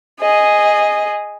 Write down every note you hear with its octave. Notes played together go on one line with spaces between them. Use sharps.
G#4 D#5